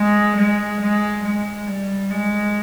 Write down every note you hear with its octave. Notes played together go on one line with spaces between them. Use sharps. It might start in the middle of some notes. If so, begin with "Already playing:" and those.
Already playing: G#3
G#3
G#3
G#3
G3
G#3